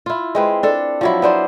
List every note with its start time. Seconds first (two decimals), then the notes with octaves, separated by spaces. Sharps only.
0.06 E4 F4
0.35 G#3 C4 B4
0.63 D4 A4
1.01 F3 F#3 E4
1.22 B3 D4 C5